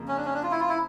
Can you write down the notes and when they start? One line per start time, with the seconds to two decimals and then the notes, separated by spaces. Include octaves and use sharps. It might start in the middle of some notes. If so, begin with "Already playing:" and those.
Already playing: F2 C#3 F3 A#3
0.08 C#4
0.17 D4
0.25 C#4
0.34 D4
0.43 F4
0.51 E4
0.60 F4
0.69 E4